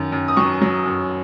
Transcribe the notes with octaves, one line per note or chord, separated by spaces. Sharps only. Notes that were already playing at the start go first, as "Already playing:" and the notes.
Already playing: F#2 D#3
F#2
D#6
F#3 C#6
F#3
F#2